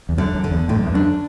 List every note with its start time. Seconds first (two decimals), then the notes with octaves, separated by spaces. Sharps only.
0.09 E2
0.18 F#2 D3
0.35 F#2
0.44 D3
0.51 E2
0.68 A2 D3
0.76 F#2
0.85 E2
0.93 F#2 D4